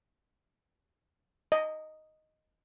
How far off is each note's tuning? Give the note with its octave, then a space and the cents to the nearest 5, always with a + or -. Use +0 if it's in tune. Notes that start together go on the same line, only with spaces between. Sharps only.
D#5 +0